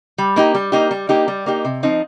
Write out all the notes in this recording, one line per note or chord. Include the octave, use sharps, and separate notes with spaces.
G3
A#3 D#4 G4
G3
A#3 D#4 G4
G3
A#3 D#4 G4
G3
A#3 D#4 G4
C3
F3 C4 D#4